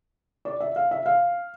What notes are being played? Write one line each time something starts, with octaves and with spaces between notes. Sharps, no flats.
D5
E5
F5
E5
F5